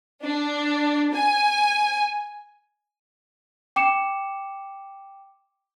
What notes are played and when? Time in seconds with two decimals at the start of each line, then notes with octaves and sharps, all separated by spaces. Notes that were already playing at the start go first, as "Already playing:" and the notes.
0.22 D4
1.14 G#5
3.76 G5 D6 C#7 E7